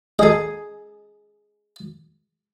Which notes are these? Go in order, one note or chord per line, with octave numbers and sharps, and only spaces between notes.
G#4 A4 D#5